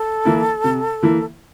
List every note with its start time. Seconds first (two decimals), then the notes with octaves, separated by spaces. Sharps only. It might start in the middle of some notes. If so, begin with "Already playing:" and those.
Already playing: A4
0.25 E3 A#3 E4
0.64 C3
1.03 E3 A#3 E4